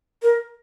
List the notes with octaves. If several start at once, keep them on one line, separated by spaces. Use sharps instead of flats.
A#4